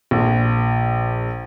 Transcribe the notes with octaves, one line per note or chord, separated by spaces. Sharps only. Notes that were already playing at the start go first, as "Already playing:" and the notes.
A#1